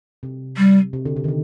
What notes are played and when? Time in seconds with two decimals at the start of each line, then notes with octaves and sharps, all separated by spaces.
0.23 C3
0.57 G3
0.93 C3
1.05 D3
1.16 C3
1.24 D#3
1.28 D3